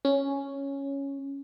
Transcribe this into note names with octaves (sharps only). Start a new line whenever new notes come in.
C#4